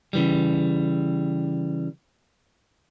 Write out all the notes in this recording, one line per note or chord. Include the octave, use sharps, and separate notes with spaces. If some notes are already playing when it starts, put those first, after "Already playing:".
C#3 E3 G3